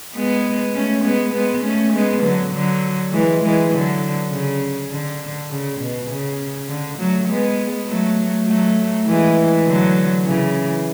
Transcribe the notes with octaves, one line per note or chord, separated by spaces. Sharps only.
G#3 B3
A3 C#4
G#3 B3
G#3 B3
A3 C#4
G#3 B3
D3 F#3
D3 F#3
E3 G#3
E3 G#3
D3 F#3
C#3
D3
C#3
B2
C#3
D3
F#3 A3
G#3 B3
F#3 A3
F#3 A3
E3 G#3
D3 F#3
C#3 E3